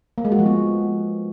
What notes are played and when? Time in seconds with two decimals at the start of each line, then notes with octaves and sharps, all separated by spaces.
0.18 A#3
0.25 G#3
0.32 F#4
0.39 F3
0.46 B3